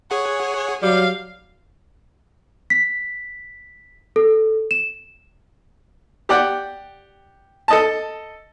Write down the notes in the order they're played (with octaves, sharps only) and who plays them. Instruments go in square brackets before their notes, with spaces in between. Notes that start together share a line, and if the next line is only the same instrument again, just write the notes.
[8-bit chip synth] G#4 F#5 [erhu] C#5
[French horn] F#3 [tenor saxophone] G3 [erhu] F5
[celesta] B6
A4
E7
[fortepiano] G4 D5 F#5 G5
A4 D#5 A5